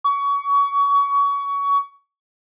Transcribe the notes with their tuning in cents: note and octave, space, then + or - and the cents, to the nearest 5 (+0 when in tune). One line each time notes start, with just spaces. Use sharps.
C#6 +25